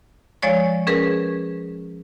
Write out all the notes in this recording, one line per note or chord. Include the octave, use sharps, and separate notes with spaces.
F3 G#3 C#5 D5 C#6
C#4 G#4 A#4 B4